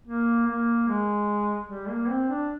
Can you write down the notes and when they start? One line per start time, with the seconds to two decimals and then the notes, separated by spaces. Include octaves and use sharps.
0.07 A#3
0.47 A#3
0.88 G#3
1.69 G3
1.89 A#3
2.09 C4
2.29 D4